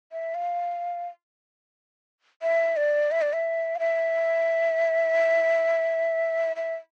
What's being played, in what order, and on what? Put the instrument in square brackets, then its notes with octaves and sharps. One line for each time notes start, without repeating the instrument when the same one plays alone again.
[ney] E5
F5
E5
D5
E5
D5
E5
F5
E5
E5